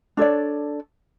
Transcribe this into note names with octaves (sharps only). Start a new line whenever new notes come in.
D4 A4 C#5 D5